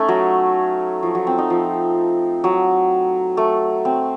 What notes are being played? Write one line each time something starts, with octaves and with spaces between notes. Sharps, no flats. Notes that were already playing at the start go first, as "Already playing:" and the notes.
Already playing: A3 C#4 D#4
F#3
F3
F#3
C4
D#4
F3
F#3
A3
C4